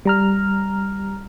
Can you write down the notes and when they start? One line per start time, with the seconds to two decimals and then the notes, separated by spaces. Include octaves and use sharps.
0.05 G3 A#5 F6